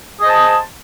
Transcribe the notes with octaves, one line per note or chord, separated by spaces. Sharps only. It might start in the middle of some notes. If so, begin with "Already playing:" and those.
G#4 C5 D#5 A5